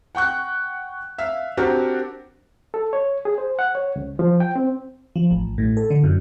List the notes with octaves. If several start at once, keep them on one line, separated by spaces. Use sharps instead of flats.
F#5 G5 C#6 F#6
E5 F5
C4 D4 F#4 G4 A#4
A4
C#5
G#4
C5
F#5
C#5
C#2
F3
G5
C4
F3
A1
A2
A4
D3
F#2